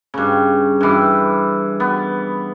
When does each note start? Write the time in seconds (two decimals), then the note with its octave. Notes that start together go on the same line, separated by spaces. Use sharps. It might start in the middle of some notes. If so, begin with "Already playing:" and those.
0.14 G2 C#3
0.81 G2 E3
1.80 B3